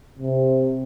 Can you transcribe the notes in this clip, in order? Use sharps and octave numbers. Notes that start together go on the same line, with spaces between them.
C3